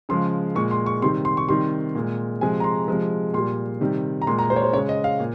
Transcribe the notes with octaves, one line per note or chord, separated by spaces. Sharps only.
C#3 F3 G#3 C6
A#2 G#3 C#6
C6
C#6
C3 D#3 G3 C6
C6
C#6
C3 D#3 G3 C6
A#2 G#3
C3 F3 G#3 G#5
A#5
C6
C3 F3 G#3
A#2 G3 C6
C3 D#3 G3
A#5
A#2 G#3 C6
A#5
C5
C#5
C5
C#3 G#3 C#5
D#5
F5
A#2